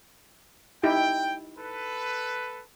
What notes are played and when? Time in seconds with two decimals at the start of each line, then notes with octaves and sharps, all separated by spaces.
0.83 D#4 E4 G4 G5
1.58 A4 B4